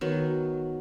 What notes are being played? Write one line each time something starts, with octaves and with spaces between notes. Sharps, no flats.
D#3 F#3 B3 F#4